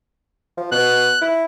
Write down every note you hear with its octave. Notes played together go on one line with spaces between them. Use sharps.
F3
B2 F#6
E4